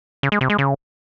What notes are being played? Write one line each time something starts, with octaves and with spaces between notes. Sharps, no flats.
C#3
G#3
C3
G#3
C#3